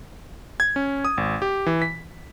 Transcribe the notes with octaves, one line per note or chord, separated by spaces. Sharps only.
G#6
C#4
D#6
G#1
G4
E3
B6